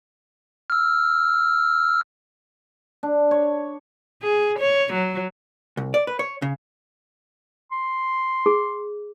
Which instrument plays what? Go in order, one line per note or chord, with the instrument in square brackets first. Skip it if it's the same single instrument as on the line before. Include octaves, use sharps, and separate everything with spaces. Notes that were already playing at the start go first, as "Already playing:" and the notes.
[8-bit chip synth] E6 F6
[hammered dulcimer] D4
C#5
[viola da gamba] G#4
C#5
F#3
[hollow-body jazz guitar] C2
D5
B4
C#5
C#3
[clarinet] C6
[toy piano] G#4